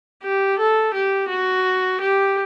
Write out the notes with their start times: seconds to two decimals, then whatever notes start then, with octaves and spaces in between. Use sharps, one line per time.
0.23 G4
0.59 A4
0.94 G4
1.30 F#4
2.01 G4